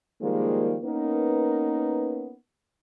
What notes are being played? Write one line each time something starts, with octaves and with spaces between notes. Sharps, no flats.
D#3 F3 G3 G#3 A#3
A#3 B3 C#4 D#4 A#4 B4